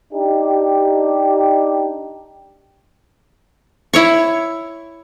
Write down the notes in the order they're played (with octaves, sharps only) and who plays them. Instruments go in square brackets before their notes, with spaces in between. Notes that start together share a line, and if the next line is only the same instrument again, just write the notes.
[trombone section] D4 D#4 G4
[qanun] E4 C#5 C#6